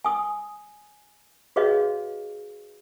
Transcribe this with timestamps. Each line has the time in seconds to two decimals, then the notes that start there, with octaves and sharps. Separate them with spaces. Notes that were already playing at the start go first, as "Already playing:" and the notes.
0.05 G#5 D#6
1.56 F#4 G#4 B4 C#5 D#5 F5